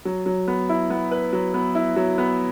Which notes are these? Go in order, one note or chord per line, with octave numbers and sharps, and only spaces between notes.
F#3
F#3
B3
E4
B3
B4
F#3
B3
E4
F#3
B3